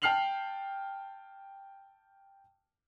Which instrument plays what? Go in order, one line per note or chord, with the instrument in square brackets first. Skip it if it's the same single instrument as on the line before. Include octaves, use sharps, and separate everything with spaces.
[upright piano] G5 A5 F6 C7 F7 F#7